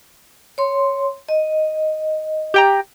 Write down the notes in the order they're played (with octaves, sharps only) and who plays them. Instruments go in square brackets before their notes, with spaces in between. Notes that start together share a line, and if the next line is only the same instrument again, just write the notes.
[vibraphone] C#5 C6
D#5
[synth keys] G4 G5 A#5